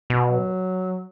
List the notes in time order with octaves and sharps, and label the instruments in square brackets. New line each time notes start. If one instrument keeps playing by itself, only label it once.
[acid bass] B2
[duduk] F#3